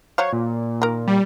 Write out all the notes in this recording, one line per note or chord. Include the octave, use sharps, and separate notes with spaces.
F#3 C5 C#5 F5
A#2
D#3 A#4
G3